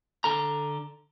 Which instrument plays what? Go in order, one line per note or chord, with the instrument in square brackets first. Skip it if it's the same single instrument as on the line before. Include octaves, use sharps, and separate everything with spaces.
[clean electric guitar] D3 A4 A#5